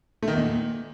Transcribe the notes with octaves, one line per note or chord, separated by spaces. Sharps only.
A3
D#3
E2
A#2